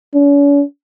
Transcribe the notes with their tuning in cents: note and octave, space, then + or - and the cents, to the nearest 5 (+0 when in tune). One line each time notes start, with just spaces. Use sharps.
C#4 +45